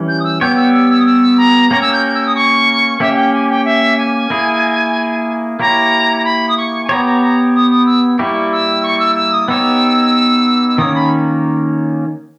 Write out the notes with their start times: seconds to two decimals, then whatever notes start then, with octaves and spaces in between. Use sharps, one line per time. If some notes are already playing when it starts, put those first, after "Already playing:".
Already playing: E3 G3 C#4
0.08 G6
0.20 D#6
0.24 E6
0.41 G3 B3 G4 C#5 G6
0.57 E6
0.74 E6
0.90 E6
1.00 D#6
1.06 E6
1.38 A#5
1.71 A#3 C#4 G4 A#4 C#5 A#5
1.82 E6
1.93 G6
2.15 E6
2.26 D#6
2.36 C#6
3.00 A#3 C#4 G4 E5
3.13 E5
3.16 G5
3.33 G#5
3.49 G5
3.65 E5
3.98 G#5
4.30 A#3 E4 G#4
5.60 A#3 E4 G4 C#5 A#5
6.17 A#5
6.25 B5
6.49 D#6
6.57 C#6
6.85 G#5
6.89 B3 G4 C#5 A#5
7.05 A#5
7.21 A#5
7.55 D#6
7.70 D#6
7.86 E6
8.19 G3 A#3 E4 G4 C#6
8.52 E6
8.83 C#6
8.99 E6
9.16 E6
9.32 D#6
9.48 B3 D#4 G4 C#5 E6
10.68 E6
10.78 D#3 A#3 C#4 D#6
10.95 B5